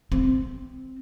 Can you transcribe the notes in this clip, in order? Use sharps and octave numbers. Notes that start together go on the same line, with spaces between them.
C4